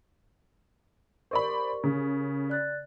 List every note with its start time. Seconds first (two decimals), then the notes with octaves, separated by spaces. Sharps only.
1.31 G4 A#4 C5 D5 B5 C#6
1.84 C#3
2.50 D5 F#6 A6